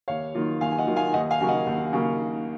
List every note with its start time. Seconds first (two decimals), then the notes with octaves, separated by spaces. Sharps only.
0.08 D#2 C#5 F5
0.35 D#3 F#3 A#3 F4
0.61 D#2 F5 G#5
0.72 G#5
0.78 D#5 F#5
0.87 D#3 F#3 A#3 F4
0.96 F5 G#5
1.13 D#2 D#5 F#5
1.31 F5 G#5
1.40 C#3 F#3 A#3
1.48 D#5 F#5
1.67 D#2
1.93 C#3 F#3 A#3